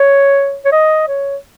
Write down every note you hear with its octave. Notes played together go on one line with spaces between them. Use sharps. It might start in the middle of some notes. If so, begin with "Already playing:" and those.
Already playing: C#5
C#5
D#5
C#5